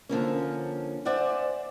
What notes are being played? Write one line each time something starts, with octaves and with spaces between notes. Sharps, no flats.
D3 F3 A#3 C#4
C5 D5 E5 F#5 G#5